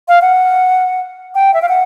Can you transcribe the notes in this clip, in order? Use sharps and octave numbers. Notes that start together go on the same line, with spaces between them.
F5
F#5
G5
E5
F5
F#5